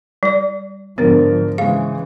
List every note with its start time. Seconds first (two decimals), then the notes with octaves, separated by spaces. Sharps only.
0.23 G3 D5
0.98 G#2 D3 F3 B3 A#4 A6
1.58 C#3 E3 G#3 G#4 F5